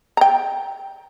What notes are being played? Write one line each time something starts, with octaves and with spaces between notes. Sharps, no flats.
G5 A#5